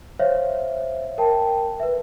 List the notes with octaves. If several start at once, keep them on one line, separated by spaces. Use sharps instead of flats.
C5 C#5 E5 F5
A#4 G5 A5
B4 E5